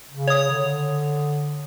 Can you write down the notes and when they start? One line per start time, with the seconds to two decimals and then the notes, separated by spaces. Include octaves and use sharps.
0.11 C#3
0.28 C#5 D#6
0.51 D3